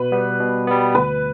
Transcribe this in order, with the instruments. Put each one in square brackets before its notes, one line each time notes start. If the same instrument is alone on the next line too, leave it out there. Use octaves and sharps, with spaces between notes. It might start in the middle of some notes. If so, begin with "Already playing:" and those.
Already playing: [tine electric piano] B2 [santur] B4
[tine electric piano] G3 B3
B2
G3 B3
[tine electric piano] D2 [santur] B4